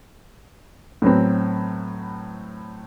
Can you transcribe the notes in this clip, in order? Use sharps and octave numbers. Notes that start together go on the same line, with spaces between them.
A2 F#3 B3 C4